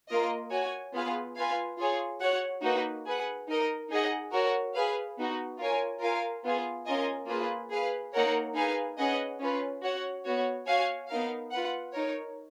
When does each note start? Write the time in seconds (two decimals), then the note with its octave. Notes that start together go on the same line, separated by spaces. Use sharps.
0.09 A#3 F4 A#4 D#5
0.51 F#4 C#5 G#5
0.93 B3 F4 G#4 B4 F5
1.37 F4 B4 F5 G#5
1.78 F4 G#4 C#5
2.20 F#4 C#5 F#5
2.63 A#3 D#4 F#4 B4
3.06 G#4 B4 F#5
3.48 D#4 A#4 D#5
3.90 D#4 G#4 D#5 F#5
4.33 F#4 A#4 C#5
4.75 G#4 B4 F5
5.18 B3 D#4 F#4
5.59 F4 A#4 C#5 G#5
6.01 F4 A#4 F5 G#5
6.44 B3 F4 G#4
6.86 C#4 F4 A#4 D#5 G#5
7.29 A#3 F4 G#4 B4
7.71 G#4 B4 F5
8.14 A#3 D#4 A#4 C#5 F#5
8.56 D#4 G#4 B4 F5 G#5
8.98 C#4 G#4 B4 D#5 F#5
9.40 C#4 F4 B4
9.83 F#4 C#5 F#5
10.26 B3 F#4 C#5
10.67 F#4 C#5 F5 G#5
11.09 B3 D#4 A#4 F5
11.52 F4 B4 F#5
11.95 D#4 A#4 C#5